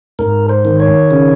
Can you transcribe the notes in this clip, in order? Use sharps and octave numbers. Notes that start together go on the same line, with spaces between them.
G#2 A#4
C5
D#3
C#5
C#3